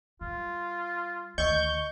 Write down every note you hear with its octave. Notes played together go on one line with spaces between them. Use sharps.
G3 F4
D2 D#3 D#5 C#6 G6